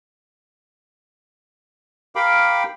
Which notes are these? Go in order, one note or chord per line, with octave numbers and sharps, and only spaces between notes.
G4 A#4 F5 G5 B5 D6